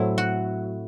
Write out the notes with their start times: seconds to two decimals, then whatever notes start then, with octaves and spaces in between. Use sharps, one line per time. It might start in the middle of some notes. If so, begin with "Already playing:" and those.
Already playing: A2 F#3 A3 C4 E4
0.18 F#4